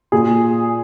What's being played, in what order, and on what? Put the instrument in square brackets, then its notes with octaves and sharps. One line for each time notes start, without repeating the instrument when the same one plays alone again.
[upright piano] A#2 G#4